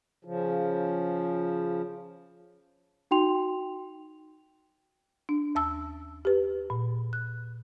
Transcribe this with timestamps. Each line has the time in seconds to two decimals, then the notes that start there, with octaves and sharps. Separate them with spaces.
0.25 C#3 F3
3.11 D#4 F#4 G5 C6 F7
5.29 D4
5.55 D#2 A5 E6
6.25 G4 B4
6.70 A#2
7.13 F#6